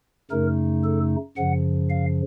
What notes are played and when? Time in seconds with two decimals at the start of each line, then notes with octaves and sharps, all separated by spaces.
0.31 F#2 C#3 A3 D#4 A#4
0.84 A4
1.37 F#2 C#3 F3 F#5
1.90 F5